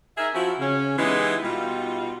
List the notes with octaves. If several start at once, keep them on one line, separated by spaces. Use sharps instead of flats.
D#4 G#4 A#4 E5
F3 C#4 E4 F#4
C#3 C#4
E3 G#3 B3 D#4 E4 G4
B2 G3 D#4 F4